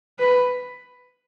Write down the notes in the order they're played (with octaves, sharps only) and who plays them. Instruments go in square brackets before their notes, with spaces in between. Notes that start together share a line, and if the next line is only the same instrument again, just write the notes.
[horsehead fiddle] B4